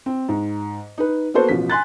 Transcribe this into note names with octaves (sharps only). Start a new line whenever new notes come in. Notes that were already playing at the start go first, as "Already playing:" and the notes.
C4
G#2
D#4 B4
A#3 B3 F#4 A4 C5
A1 B2 F3 B6
G#5 C6 F#6 A6